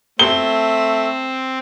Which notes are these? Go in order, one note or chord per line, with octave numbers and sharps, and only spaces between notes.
A3 C4 G7